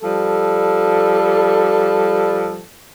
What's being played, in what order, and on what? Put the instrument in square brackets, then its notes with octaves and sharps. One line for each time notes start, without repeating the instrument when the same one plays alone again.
[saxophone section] F3 G3 A4